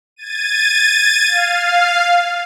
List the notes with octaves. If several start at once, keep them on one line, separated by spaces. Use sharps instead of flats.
G#6 A6 D#7
F5